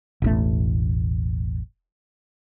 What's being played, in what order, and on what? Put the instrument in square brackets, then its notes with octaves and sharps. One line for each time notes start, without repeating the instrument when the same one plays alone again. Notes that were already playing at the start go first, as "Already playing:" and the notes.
[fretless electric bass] E1 A1 A3